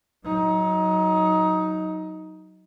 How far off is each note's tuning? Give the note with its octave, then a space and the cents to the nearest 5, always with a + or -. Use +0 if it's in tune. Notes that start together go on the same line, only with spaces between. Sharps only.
F#3 +0 D#4 +20